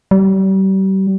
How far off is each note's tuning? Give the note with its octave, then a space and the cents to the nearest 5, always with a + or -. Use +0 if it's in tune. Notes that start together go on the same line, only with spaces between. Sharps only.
G3 -35